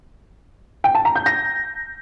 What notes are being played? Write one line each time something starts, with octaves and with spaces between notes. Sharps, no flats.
G5
A5
A#5
G6
A#6